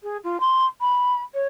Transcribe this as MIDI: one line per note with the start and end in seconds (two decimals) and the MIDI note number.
0.03 0.17 68
0.23 0.39 65
0.40 0.65 84
0.80 1.22 83
1.34 1.47 73